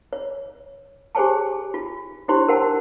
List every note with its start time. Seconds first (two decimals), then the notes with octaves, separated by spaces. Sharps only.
0.13 C#5
1.15 G4 G#4 C5 C#5 G#5 A5
1.74 F4
2.28 D4 E4 G4 C5 C#5 C6
2.48 A#4 C5 F#5 G5 A5